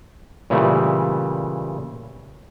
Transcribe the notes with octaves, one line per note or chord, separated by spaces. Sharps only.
A#2 C#3 E3 G3 A3